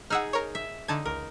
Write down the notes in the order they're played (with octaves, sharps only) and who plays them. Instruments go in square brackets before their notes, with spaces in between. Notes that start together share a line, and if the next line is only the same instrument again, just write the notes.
[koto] D#4 G#4 [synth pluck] F#5 E6 F6
[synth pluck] A#4 C#5
[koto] E5
[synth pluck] D3 A5 G#6 [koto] D#4
[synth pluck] C#2 [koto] A#4